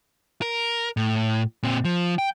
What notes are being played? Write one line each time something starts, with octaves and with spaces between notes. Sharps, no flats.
A#4
A2
A#2 C4
F3
G5